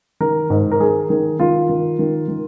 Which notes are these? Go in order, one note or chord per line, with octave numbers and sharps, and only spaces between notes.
D#3 A#4
G#2
A#4
D#3 G#4
D#3
D#3 F4
D#3
D#3
D#3